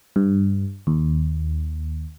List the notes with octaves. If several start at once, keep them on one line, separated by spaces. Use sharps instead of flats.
G2
D#2